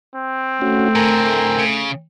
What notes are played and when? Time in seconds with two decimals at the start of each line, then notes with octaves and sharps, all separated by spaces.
0.15 C4
0.62 A3 C#4 F#4
0.95 A2 D3 A#4 G#5 A#5
1.59 C#3